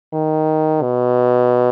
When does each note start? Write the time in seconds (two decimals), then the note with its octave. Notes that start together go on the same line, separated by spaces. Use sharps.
0.13 D#3
0.82 B2